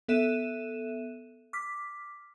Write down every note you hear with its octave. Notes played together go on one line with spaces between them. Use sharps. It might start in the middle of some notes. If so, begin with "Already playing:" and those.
B3 A4 E5 F#6 D#7 E7
D6 F6 B6